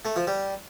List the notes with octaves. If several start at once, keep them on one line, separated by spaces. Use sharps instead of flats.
A3
F3
G3